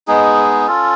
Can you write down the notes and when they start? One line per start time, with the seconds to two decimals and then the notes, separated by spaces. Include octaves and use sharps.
0.08 G#3 B3 D#4 G#4
0.67 C#4 F4 A4